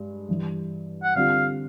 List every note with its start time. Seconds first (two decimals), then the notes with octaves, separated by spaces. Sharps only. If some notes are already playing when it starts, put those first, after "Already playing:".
Already playing: G2 G#3
0.28 G2 E3 G3
1.03 F#5
1.15 D3 G3 C4 F4 F5